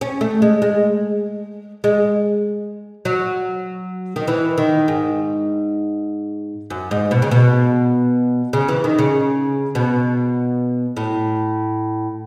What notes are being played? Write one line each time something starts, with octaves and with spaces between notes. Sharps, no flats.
C#4
A3
G#3
G#3
G#3
F#3
D#3
E3
D#3
G#2
F#2
G#2
B2
C#3
B2
C#3
E3
D#3
C#3
B2
A2